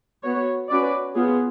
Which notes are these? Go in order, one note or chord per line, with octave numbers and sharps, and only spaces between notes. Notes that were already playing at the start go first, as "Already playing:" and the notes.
B3 F#4 C#5
C#4 F#4 B4 D5
B3 F4 G#4